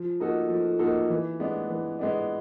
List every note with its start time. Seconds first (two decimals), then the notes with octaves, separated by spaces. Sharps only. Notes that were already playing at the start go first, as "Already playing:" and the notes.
Already playing: F3
0.20 A#3 D#4 F#4 A4
0.49 F3
0.79 A#3 D#4 F#4 A4
1.10 E3
1.40 G#3 B3 D4
1.70 E3
1.99 G#3 B3 D4